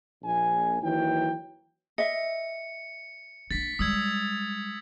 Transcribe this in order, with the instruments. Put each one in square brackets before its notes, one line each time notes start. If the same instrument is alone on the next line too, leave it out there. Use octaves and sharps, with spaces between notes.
[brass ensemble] A#1 G#5
D#2 E3 F#3 G5
[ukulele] D#5 E5 [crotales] C#7
[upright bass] A#3 D4 [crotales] A6 B6
[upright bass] G3 G#3 [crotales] D#6 E6 G#6